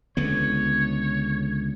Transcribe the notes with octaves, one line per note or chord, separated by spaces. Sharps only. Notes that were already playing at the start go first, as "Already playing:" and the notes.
C#2 D3 B3 C#5